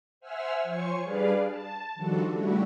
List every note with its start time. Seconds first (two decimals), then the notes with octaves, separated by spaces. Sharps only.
0.20 C5 E5 F#5 G#5 E6 F6
0.63 F3 C5 C#5 G#5 C#6 C#7
1.02 G3 D4 G#4 B4 D5 F5
1.47 A5
1.95 D#3 F3 G3 D4 F#4 A4
2.29 C#3 G3 A3 D4 E4 F#4